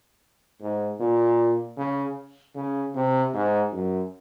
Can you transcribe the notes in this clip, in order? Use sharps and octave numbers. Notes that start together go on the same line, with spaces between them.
G#2
A#2
C#3
C#3
C3
G#2
F#2